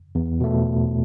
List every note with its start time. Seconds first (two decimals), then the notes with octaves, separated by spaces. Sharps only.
0.15 E2
0.40 B2 A3